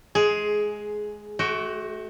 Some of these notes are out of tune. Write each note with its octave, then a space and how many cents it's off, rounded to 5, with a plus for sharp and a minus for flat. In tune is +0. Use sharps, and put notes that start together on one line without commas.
G#3 +20 G#4 +10
A3 -30 F#4 +20 G5 +0